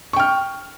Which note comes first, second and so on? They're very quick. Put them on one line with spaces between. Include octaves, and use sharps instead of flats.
C#6 G5 F6